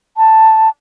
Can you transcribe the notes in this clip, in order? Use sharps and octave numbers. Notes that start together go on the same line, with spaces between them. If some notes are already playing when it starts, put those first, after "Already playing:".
A5